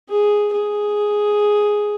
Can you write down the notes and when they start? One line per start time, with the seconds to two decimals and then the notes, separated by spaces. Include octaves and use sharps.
0.09 G#4
0.53 G#4